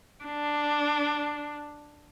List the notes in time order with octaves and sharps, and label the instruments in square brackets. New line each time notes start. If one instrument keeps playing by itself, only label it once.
[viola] D4